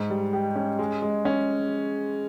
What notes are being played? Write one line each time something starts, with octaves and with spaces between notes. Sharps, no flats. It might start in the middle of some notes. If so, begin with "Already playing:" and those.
Already playing: G#2
G3
G4
C#4
G#3
G#3
C#4